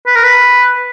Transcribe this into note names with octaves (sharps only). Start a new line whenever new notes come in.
B4
A#4
B4